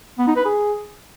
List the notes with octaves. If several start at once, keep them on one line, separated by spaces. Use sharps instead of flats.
B3
D#4
B4
G#4